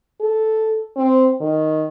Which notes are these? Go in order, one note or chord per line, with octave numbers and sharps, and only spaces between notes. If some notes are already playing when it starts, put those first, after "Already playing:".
A4
C4
D#3